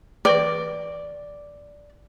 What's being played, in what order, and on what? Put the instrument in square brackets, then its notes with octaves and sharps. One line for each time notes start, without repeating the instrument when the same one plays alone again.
[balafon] E3 B4 G5 [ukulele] D5